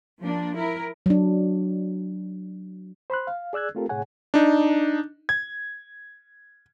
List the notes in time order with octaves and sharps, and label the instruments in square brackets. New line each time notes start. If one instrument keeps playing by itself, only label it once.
[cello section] F3 A#3 D4
E4 A#4
[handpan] F#3 D4
[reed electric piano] C5 B5 C6 F#6
F5
G#4 D5 E6 F#6 G#6
A3 C4 F4 G4 A4 A#4
A2 C3 G#4 C#5 F#5 G#5
[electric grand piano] D4 D#4
G#6